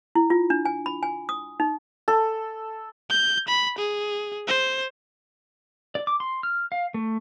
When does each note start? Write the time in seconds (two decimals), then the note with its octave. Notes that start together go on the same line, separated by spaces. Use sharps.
0.15 E4
0.30 F4
0.50 D4
0.65 G#5
0.86 B5
1.03 G#5
1.29 D#6
1.60 D#4
2.08 A4
3.10 G6
3.48 B5
3.78 G#4
4.48 C5
5.95 D5
6.07 D6
6.20 C6
6.43 F6
6.72 F5
6.94 A3